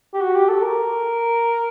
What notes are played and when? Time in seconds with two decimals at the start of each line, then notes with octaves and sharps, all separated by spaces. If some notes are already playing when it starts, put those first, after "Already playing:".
0.14 G4
0.20 F#4
0.35 G4
0.49 A4
0.62 A#4